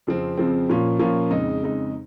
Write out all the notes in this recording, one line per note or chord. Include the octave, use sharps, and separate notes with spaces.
F2 C#3 F3 C4
F2 C#3 F3 C4
A#2 F3 A#3 C#4 F4
A#2 F3 A#3 C#4 F4
F2 C#3 G#3 D#4
F2 C#3 G#3 D#4